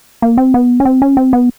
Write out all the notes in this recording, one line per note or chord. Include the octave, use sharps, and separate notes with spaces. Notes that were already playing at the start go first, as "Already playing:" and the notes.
A#3
C4
B3
C#4
C4
C#4
C4
B3